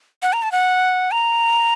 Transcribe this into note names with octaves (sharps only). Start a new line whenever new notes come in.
F#5
A#5
A5
F#5
A#5